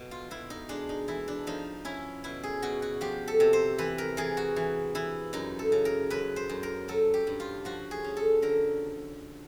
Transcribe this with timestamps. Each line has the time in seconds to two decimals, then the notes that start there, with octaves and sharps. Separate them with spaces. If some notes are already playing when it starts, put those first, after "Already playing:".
Already playing: B2
0.11 F4
0.31 B2 E4
0.50 D#4
0.69 G#3 D4
0.89 D#4
1.08 E3 E4
1.28 D4
1.47 F3 D#4
1.85 C#4 E4
2.24 B2 E4
2.43 G#4
2.62 B2 F#4
2.82 F#4
3.01 F3 G4
3.28 A4
3.40 C3
3.53 C5
3.78 E3 B4
3.98 A#4
4.17 E3 G#4
4.37 F#4
4.56 E3
4.95 E3 E4
5.33 F#2 D#4
5.59 A4
5.72 C#3
5.85 A#4
6.10 F#2 B4
6.36 C5
6.49 F#2
6.63 A#4
6.88 F#3 A4
7.14 G4
7.27 G2
7.40 F4
7.65 F3 F#4
7.91 G#4
8.04 C#4
8.17 A4
8.42 D3 A#4